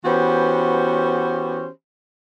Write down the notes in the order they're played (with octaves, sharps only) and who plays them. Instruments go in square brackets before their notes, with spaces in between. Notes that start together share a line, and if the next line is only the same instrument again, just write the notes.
[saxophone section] E3 B3 C#4 F#4 G4 C5